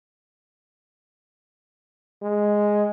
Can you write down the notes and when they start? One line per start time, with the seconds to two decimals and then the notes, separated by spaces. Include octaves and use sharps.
2.22 G#3